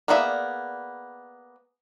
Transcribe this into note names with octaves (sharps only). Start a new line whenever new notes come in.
A#3 B3 G#4 D5 E5